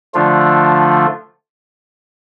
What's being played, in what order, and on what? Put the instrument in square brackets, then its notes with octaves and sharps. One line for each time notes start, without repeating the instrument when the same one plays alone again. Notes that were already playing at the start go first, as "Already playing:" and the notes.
[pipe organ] D3 F3 A3 D4 F4